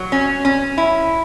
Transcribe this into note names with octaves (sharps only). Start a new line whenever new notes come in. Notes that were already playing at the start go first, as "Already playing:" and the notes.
Already playing: F#3
C#4
C#4
E4